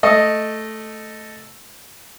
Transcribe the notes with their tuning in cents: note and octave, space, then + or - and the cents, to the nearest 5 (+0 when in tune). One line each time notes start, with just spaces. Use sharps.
A3 +0 D#5 +0